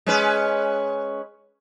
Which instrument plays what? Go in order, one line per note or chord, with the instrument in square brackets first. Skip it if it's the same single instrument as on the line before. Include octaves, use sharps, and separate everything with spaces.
[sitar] G#3 C#4 B4